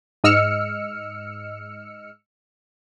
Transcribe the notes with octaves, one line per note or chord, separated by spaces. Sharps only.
G#2 D#5 E6 F6 C#7